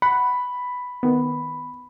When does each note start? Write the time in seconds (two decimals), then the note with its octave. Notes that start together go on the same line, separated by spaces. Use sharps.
0.02 F#5 B5
1.03 D#3 B3